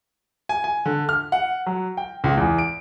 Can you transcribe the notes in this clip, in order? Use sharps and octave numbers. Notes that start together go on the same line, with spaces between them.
G#5
G#5
D3
F6
F#5
F#3
G5
C#2
E2
D7